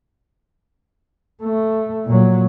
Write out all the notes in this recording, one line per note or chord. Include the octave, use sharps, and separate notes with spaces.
A3
A#2 F#3